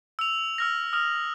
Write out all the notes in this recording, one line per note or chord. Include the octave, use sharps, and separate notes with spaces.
E6 F7
E6 F6 A#6
D#6 F6 F7